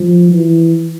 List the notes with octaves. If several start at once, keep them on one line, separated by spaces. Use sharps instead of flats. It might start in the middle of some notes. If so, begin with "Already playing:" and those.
Already playing: F3
E3